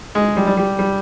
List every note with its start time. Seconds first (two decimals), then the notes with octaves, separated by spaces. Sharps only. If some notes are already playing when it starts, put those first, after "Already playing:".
0.15 G#3
0.37 G3
0.47 G3
0.57 G3
0.79 G3